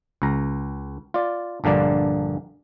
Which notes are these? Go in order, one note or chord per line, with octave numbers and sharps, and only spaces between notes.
C#2 A#5
F4 D5
A#1 G2 D3 A#3 D5